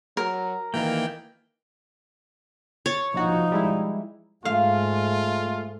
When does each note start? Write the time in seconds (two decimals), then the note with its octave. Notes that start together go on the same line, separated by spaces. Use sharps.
0.17 F#3 A#4
0.74 D2 D#3 E3 A#3 G5
2.86 C#5 A6
3.14 A#1 F3 D#4 F#4
3.52 G3 G#3 E4
4.45 G#2 G#3 A3 F4 F5